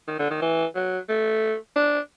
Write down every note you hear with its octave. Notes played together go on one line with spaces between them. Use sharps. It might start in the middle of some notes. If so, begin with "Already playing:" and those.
D#3
D3
D#3
E3
F#3
A3
D4